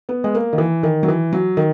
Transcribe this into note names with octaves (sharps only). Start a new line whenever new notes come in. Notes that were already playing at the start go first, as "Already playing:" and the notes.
B3
G#3
A#3
D#3
E3
D#3
F#3
E3
F#3
D#3